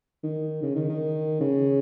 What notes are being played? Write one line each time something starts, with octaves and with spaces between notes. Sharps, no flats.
D#3
C#3
D#3
D#3
C#3